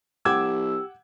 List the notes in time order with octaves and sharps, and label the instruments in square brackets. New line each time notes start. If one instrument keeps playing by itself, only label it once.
[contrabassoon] C2 [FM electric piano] G4 E6 [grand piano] F#5 D6 G#6